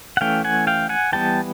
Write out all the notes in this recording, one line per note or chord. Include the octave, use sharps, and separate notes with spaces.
F#5
E3 A3 C#4 F5 G5
F#5 G#5
F5 G5
F#5 G#5
E3 G3 B3 G5 A5